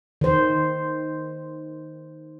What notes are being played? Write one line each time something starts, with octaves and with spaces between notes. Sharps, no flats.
D#3 C5